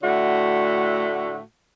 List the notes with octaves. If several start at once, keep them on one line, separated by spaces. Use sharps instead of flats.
A2 D3 A3 F#4